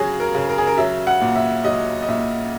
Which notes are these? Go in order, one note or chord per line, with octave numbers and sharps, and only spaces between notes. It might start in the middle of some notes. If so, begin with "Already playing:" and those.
Already playing: C#3 F#3 F#4 G#4
A#4
C#3
A#4
G#4
A#4
F#3 E5
F#5
A#2
E5
F#3 D#5
D#5
A#2 E5